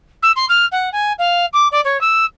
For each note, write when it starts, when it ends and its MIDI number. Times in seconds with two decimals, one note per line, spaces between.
0.22 0.31 88
0.36 0.45 84
0.49 0.66 89
0.72 0.89 78
0.92 1.13 80
1.18 1.46 77
1.53 1.68 86
1.71 1.80 74
1.84 2.00 73
2.01 2.25 88